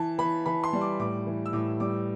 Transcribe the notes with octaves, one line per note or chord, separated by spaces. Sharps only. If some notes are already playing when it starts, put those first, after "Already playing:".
Already playing: E3 A5
E3 B5
E3 B5
C6
G3
D6
A2 D6
E3
E6
A2 D6
G3 D6